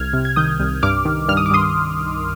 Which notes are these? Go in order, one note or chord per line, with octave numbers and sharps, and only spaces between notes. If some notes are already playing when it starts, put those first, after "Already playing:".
Already playing: C2 F6 G#6
C3
G#6
D#3 D#6 G6
C2
G2 D6 F6
D#3
G2 F6
D#6
D6
G2 C6 D#6